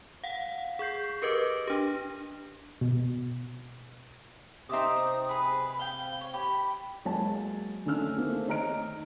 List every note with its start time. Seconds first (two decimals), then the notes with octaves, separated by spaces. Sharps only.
0.24 F5 F#5
0.79 G#4 C#6 G6 C7
1.22 G4 A#4 B4 D#5 D6
1.67 D4 G4
2.81 B2
4.69 C3 C4 D#4 E5 D6 D#6
5.29 G#4 B4 B5
5.79 F5 G5 G7
6.21 C#5
6.34 G4 B5
7.05 F#3 G#3 A#3 C#5 G#5 A5
7.85 D3 D#3 A3 C#4 E6 F6
8.18 A3 A#3 C4
8.47 D#3 C#5 D#5 A#5 F6 D7